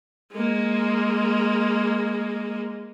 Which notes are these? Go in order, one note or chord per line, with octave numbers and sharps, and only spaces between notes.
G#3 A#3